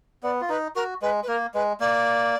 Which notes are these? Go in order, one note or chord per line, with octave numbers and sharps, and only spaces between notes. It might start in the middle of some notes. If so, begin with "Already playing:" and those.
B3 D5
F4
D#4 B4
F#4 A#4
G#3 B4
B4
A#3 A#4
G#3 B4
A#3 D5